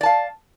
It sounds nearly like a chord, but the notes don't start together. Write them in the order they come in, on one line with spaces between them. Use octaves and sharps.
D5 A5 F5